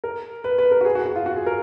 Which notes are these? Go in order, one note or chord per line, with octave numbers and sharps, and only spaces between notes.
A#4
B4
B4
A#4
F#4
G#4
F#4
F#4
F4
F#4
G#4
A#4